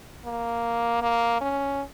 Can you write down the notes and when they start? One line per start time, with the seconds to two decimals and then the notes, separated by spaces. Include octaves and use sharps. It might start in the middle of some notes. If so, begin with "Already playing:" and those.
0.25 A#3
1.02 A#3
1.41 C#4